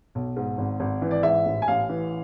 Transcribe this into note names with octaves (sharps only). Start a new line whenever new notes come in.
B1
G#2
G#1
G#1
E3
D5
G#2 E5
A1
G#5
A1 F5
E3